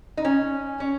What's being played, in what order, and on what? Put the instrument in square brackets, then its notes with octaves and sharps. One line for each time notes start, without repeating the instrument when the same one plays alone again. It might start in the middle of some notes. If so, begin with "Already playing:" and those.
[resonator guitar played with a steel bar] D#4
C#4
C#4